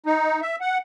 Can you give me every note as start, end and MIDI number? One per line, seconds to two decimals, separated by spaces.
0.06 0.41 63
0.42 0.56 76
0.61 0.78 78